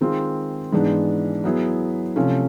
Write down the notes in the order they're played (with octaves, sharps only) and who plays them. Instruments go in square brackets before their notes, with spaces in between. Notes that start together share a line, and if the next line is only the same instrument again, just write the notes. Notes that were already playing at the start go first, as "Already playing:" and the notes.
[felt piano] D#3 G#3 C4 F4
G#2 E3 G#3 B3 D4
F#3 B3 E4 G#4
C3 F3 A3 C#4